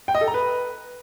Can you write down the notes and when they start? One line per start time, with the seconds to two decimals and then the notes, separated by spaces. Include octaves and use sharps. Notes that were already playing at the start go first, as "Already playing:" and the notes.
0.08 G5
0.15 D#5
0.21 A4
0.28 A#5
0.34 B4